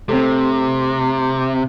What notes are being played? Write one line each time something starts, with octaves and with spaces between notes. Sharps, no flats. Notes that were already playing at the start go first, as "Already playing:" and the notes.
C3 A3 C4